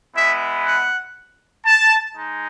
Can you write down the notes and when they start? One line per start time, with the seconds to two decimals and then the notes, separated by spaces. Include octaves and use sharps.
0.16 G#3 B3 E4 E5
0.66 F#5
1.67 A5
2.16 G#3 D#4